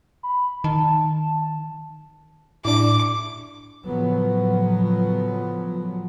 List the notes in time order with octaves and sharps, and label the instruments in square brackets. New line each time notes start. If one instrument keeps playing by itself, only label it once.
[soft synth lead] B5
[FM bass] D#3 [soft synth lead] A5
[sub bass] A2 [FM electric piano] D4 E4 [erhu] D6
[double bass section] A2 C#3 F3 F#3 B3